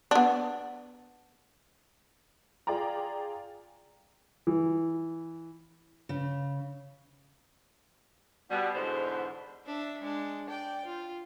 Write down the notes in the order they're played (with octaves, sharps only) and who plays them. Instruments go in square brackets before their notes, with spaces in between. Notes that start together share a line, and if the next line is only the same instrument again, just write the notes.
[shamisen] B3 D4
[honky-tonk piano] F4 G#4 D5 G5 A#5
[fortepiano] E3
[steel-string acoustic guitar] C#3
[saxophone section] B2 G3
E2 G#2 B2 D3 B4 C5
[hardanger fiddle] D4 E5
G#3 D4
D5 G5
F4